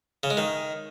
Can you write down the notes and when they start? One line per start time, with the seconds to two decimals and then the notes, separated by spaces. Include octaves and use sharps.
0.23 C#3
0.30 G#3
0.37 D#3